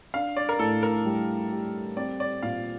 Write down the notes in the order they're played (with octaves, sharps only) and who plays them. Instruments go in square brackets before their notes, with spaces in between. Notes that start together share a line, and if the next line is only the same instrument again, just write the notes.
[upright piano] D4 [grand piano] F5
[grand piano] D5
A#4
[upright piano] A2 [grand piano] A4
[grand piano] A#4
[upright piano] G3
G4
[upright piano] C4 [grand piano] D5
[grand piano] D5
[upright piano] A#2 [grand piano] F5